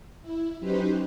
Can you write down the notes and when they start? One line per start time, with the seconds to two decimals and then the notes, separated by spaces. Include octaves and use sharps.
0.22 E4
0.60 F#3 C#4 D#4 G4 B4 C5